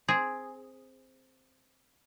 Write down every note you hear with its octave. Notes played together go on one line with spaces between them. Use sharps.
C4 G#4